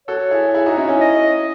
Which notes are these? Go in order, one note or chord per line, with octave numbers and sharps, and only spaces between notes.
F#4 A4 C#5
E4 G#4
E4 G#4
D#4 F#4
C#4 E4
C#4 E4
D#5